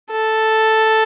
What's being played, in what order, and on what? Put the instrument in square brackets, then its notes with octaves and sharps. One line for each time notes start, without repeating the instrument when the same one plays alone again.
[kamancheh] A4